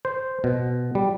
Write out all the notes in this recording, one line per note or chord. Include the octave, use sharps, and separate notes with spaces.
C5
B2
G3